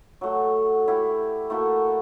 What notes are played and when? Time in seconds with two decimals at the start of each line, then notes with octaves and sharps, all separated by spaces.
0.21 F#3 A3 F#4
0.88 E4 G4 F#5
1.50 A3 A#3 E4 F#4